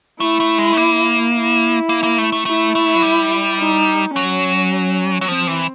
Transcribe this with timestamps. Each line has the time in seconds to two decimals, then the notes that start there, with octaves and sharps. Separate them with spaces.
0.20 A3 E4
0.40 A3
0.58 G#3
0.73 A3
0.77 A#3
1.34 E4
1.89 A#3
2.03 A#3
2.18 A3
2.32 A3
2.46 A3 E4
2.75 A3
2.95 F#3
3.03 G3
3.60 D#4
4.16 F#3 C#4
5.21 F#3
5.28 F3 C4
5.47 E3